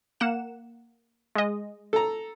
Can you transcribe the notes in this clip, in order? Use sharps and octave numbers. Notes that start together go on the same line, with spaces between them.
A#3 F#5 E7
G#3 D#5
A4 A#5